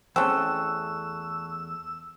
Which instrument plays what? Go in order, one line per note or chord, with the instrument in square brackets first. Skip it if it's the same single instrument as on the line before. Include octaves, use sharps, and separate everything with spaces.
[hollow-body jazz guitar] E2 A3 [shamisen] C4 C#4 [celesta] A5 C#6 F#6 [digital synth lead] E6